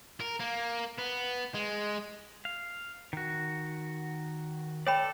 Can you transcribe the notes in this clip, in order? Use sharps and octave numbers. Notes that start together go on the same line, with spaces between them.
A#4
A#3
B3
G#3
F5
D#3 F#4
A4 C#5 D5 G5 B5